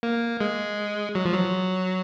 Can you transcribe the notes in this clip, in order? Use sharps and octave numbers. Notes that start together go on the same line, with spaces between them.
A#3
G#3
F#3
F3
F#3